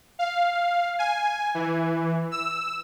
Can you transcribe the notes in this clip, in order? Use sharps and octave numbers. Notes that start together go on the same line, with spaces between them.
F5
G#5
E3
E6